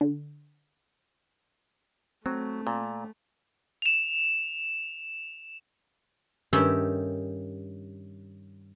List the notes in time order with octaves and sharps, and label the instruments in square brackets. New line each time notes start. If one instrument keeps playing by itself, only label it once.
[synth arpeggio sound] D3
[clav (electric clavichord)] F#3 [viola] A3 [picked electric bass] C4
[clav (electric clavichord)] A#2
[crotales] E7 F7
[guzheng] G2 D#3 C#4 G4 A4 E5